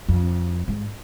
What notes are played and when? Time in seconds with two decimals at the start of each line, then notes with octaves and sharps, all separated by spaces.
0.08 F2
0.68 G#2